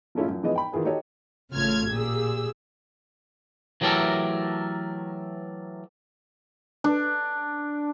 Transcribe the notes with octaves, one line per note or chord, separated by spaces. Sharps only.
F3 G#3 A3 C#4 E4 F4
F#2 F3
E3 F3 G#3 B3 G#4 D#5
G5 B5
D#3 E3 F4 G#4 B4
D#4 F#4 G4 A4 C#5 D#5
A1 C#3 A3 F4 F6 G#6
A#2 G4 G#4 E6
E3 F#3 A3 G4 A4 A#4
D4